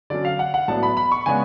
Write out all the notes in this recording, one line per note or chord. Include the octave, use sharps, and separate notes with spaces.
D3 F#3 C#4 D5
F5
F#5
F#5
A2 F#3 B3 D4 A5
B5
B5
C#6
C#3 G#3 B3 D4 G#5